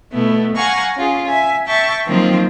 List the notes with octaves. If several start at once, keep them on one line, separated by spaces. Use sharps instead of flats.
B2 A3 B3 E4
F5 F#5 G#5 A#5 C#6
C#4 F4 G#4
E5 G#5
E5 G5 A5 C#6
D#3 F3 F#3 A#3 C4 F4